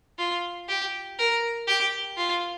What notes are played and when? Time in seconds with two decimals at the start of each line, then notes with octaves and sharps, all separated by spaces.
0.18 F4
0.68 G4
1.19 A#4
1.68 G4
2.17 F4